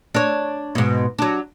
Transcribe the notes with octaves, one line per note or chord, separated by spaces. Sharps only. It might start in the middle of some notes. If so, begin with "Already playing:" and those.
D4 C#5
G#2 B2
F#3 D4